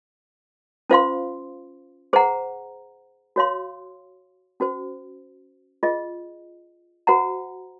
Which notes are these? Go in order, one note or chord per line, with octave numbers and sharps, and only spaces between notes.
C#4 F4 C5 F5 C6
G#4 C5 F#5 A#5
F#4 C#5 F5 C6
C#4 F#4 C5
F4 G#4 D#5
F#4 C5 F#5 A#5